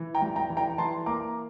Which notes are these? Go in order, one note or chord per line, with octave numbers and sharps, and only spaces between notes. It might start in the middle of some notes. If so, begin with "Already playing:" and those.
Already playing: E3
G5 A#5
G3
G5 A#5
E3
G5 A#5
E3 A5 C6
A#3 A#5 D6